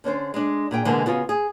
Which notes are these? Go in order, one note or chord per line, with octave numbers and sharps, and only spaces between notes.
D3 C#4 D4 C5
G#3 D4
A#2 G#4 G5
B2 D3 E3 G#3 A#3
C#3 B3 F4 F#4
G#4